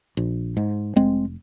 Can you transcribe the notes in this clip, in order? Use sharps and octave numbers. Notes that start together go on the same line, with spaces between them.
A#1
G#2
F1 G#3 C4